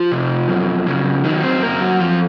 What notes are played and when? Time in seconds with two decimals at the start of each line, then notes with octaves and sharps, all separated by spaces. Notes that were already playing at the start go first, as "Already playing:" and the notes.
Already playing: F3 F4
0.12 C3
0.49 F#2
0.87 C#3
1.25 D#3 F#3 D#4
1.43 C4 C5
1.62 F#2 A#3 A#4
1.81 F#3 F#4
2.00 F2 F3 F4